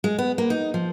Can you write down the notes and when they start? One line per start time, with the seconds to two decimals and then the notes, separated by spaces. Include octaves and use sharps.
0.04 G#3
0.18 B3
0.38 A#3
0.50 D#4
0.74 F3